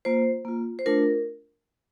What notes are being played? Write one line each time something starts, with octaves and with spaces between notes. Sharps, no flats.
A#3 F4 C5
A#3 F4
C5
A3 D4 F4 A#4